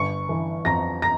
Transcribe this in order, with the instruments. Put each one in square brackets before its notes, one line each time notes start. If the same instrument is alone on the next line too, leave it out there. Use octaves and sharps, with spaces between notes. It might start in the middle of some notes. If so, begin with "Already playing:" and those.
Already playing: [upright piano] G1 C#6 C#7
E3
F2 A#5 A#6
A#5 A#6